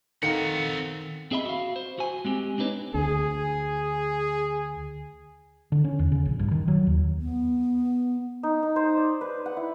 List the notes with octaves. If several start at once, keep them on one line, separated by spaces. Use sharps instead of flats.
D#3 C4 A4 F5 F#5 A#5 C#7
C4 G#4 D#5 E5 B5
F#4 F5
C5
F#4 G#5
G#3 C4 G4
C4 D4 D#4 B4 C#5
D2 D4 G#4
D3
C#4
E2
C#3
A#1
G2
D#3
F#3
D#2
B3
D#4
D#4
C5
D5
B4
F#5
E4